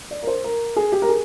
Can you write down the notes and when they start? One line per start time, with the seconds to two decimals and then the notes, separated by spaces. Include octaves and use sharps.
0.11 D5
0.23 A#4
0.27 C5
0.44 A#4
0.76 G#4
0.92 G4
1.02 A#4
1.09 G#4